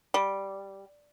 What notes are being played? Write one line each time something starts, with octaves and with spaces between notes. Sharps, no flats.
G3